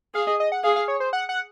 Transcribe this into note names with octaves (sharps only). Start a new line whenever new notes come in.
G#4 F5
D#5
D#5
F#5
G#4 F5
F5
C#5
C5
F#5
F#5